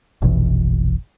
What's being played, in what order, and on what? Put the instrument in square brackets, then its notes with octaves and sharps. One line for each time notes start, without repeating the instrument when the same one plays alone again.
[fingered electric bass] F1 A#1 B2 E3